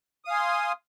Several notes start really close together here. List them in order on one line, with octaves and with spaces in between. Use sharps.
D#6 F5 G#5 C6